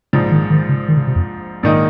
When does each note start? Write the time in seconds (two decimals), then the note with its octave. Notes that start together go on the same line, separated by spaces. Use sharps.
0.13 A#1 G#2 C#3 F3
0.31 D#3
0.50 D#3
0.69 C#3
0.88 D#3
0.97 C#3
1.07 C3
1.16 F2
1.63 A#1 G#2 D#3 A#3 D#4